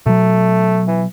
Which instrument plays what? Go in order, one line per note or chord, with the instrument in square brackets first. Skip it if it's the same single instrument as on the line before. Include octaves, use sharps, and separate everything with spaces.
[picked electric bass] B2 F#3 [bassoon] A3
[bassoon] E3